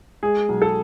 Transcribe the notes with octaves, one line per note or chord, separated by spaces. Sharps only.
G#3 G#4
B1
A4